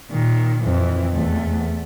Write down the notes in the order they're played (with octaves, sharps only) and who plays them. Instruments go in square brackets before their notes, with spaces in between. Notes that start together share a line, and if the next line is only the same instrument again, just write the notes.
[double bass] A#2 [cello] D#3
[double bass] F2 [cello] E3
[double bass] E2 [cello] A3